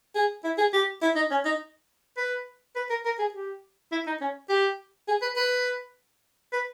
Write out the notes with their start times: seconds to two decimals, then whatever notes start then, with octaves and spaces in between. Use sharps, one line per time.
0.15 G#4
0.44 E4
0.58 G#4
0.73 G4
1.02 E4
1.16 D#4
1.31 C#4
1.45 D#4
2.17 B4
2.76 B4
2.90 A#4
3.05 A#4
3.19 G#4
3.34 G4
3.92 E4
4.07 D#4
4.21 C#4
4.49 G4
5.08 G#4
5.22 B4
5.36 B4
6.53 B4